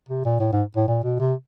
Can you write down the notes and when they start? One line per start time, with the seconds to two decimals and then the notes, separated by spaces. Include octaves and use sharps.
0.09 C3
0.25 A#2
0.40 A2
0.52 G#2
0.76 A2
0.88 A#2
1.03 B2
1.20 C3